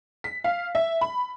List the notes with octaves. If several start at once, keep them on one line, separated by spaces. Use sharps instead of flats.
B6
F5
E5
B5